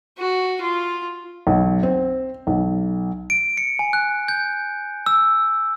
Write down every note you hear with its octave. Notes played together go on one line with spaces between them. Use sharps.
F#4
F4
B1
C4
B1
D7
C#7
G#5
F#6
G6
E6